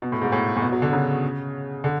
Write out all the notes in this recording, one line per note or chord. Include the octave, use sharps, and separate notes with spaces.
B2
A2
G#2
A2
A2
B2
F#3
D3
C#3
D3